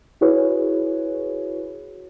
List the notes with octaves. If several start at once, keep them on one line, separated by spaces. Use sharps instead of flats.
E4 F#4 G#4 B4 C#5